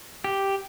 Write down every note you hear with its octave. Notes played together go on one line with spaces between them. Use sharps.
G4